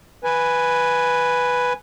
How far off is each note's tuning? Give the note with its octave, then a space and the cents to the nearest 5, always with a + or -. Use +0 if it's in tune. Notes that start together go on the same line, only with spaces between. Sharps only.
B4 +0 G#5 +0